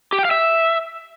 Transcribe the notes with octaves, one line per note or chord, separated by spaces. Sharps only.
G4
G5
F5
E5